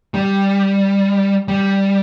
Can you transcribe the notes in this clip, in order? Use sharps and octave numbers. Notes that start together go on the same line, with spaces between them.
G3
G3